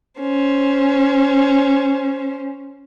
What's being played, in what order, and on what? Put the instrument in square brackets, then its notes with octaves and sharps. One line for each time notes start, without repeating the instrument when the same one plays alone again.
[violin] C#4 C5